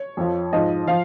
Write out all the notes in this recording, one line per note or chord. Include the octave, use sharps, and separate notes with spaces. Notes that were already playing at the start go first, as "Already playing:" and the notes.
Already playing: C#5
F2 F3
G#2 F3 D#5
F3 F5